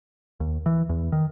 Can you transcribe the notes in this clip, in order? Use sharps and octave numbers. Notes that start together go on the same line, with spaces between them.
D#2
E3
E2
D#3